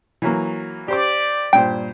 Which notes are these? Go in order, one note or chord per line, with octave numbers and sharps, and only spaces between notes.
E3 F#3 A#3
G4 C5 D5 D6
G2 A#2 C5 G5